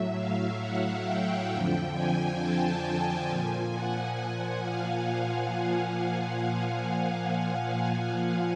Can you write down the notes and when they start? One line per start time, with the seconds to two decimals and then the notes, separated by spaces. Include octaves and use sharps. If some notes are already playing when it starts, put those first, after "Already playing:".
Already playing: A2 F#3 E5
0.15 F5
0.59 F#5
1.04 G5
1.49 F2 D3 F3
1.94 G#5
2.38 A5
3.28 A#2 F3 G#5
3.73 F#5
4.63 F5